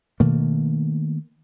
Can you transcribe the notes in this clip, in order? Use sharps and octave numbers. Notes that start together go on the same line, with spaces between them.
B2 D#3 A3 A#3